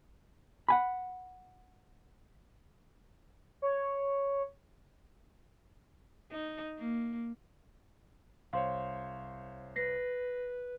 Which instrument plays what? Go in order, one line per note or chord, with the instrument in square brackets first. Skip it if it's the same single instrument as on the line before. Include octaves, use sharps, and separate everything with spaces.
[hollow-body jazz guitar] F#5 G#5 B5
[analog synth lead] C#5
[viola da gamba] D#4
A#3
[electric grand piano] C2 C5 C#5 [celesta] F5 C6
[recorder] B4 [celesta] A#6 C7